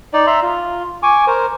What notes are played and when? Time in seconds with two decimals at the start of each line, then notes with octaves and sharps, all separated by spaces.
0.14 D#4 D5
0.27 E5 A#5 C6
0.42 F4
1.03 G#5 C#6 D6
1.27 A#4 C5